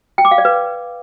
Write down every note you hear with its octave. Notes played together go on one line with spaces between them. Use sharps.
G5
D6
F5
D5
B4